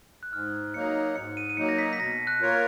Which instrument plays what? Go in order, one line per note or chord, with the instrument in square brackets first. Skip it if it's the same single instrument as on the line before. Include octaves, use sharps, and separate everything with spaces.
[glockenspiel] F#6
[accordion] G#2 [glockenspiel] F6
[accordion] F#3 A#3 D#4 [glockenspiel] C#7
[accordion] G#2 [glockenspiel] C#7
[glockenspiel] D#7
D#7
[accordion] F#3 A#3 D#4 [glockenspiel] C#7
[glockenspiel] A#6
B6
B6
[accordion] B2 [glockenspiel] A#6
[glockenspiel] F#6
[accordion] A#3 F4 A#4 C#5